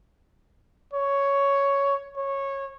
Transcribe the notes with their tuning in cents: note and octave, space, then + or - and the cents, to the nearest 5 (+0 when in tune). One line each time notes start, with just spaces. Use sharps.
C#5 +5
C#5 -15